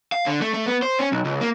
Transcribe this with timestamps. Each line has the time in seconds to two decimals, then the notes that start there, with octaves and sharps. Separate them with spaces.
0.12 F5
0.26 D3
0.41 A3
0.54 A3
0.66 B3
0.82 C5
0.99 C#4
1.12 B1
1.25 C#2
1.41 A#3